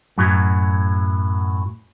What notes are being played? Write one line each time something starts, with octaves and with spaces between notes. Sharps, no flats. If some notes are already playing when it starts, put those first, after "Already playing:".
F#2 A2 F#3